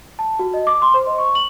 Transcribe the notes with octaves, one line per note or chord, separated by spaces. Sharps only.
A5
F#4
D#5
D6
C6
C5
D#5
C#6
F#7